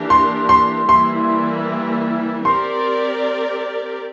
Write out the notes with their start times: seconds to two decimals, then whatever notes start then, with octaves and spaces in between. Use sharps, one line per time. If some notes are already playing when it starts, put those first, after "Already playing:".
Already playing: E3 A#3 D4 G4 A#4
0.10 C6
0.49 C6
0.89 E3 G3 A#3 E4 C6
2.45 C4 G4 A#4 D5 C6